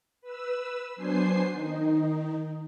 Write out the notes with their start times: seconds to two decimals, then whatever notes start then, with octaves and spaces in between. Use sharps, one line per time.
0.22 B4 E6
0.96 F#3 B3 D4 C5 G#5 C7
1.52 D#3 D#4